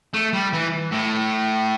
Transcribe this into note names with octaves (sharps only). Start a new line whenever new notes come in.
A3
G3
E3
A2